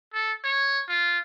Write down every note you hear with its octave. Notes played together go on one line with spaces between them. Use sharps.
A4
C#5
F4